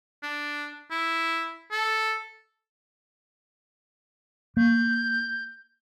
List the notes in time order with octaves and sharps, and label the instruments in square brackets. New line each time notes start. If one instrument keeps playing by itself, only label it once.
[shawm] D4
E4
A4
[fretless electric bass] A#3 [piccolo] G6